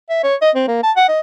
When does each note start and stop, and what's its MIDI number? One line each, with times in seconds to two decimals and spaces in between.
0.10 0.19 76
0.23 0.35 73
0.41 0.50 75
0.56 0.66 60
0.68 0.80 58
0.83 0.91 81
0.97 1.06 78
1.08 1.20 75